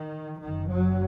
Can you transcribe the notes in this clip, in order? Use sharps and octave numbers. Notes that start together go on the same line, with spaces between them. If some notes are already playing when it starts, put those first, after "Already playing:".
Already playing: D#3
F#1 F#2 D#3
F#2 F#3